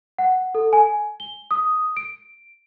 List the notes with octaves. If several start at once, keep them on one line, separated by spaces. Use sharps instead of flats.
F#5
A4
G#5
G7
D#6
D7